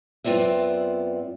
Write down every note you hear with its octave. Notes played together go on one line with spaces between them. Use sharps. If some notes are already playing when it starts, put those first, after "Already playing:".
F#2 B3 C4 F4 D5 E5